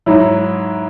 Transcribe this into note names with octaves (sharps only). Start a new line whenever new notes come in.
G#2 F#3 E4